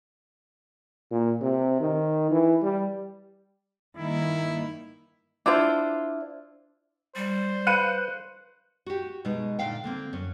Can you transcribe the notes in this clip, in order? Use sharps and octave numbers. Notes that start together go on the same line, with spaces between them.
A#2
C3
D#3
E3
G3
G2 D#3 A#3 D#4 E4
D4 E4 F4 C5
G3 C5
B4 F5 F#6 C#7 D#7
F#4 G4
B2 G#3 D#4
A#2 D3 F5 G5
D3 A#3 C4
F#2 C#4